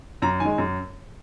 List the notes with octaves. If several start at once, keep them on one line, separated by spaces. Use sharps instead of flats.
F#2 A#5
D#3 G#5
G#3
F#2